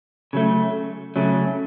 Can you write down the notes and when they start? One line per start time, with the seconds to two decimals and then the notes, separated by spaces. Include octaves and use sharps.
0.33 C#3 F#3 A3
1.16 C#3 F#3 A3